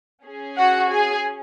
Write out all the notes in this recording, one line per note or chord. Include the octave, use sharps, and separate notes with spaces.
C#4 G#4
F#4 F#5
G#4 G#5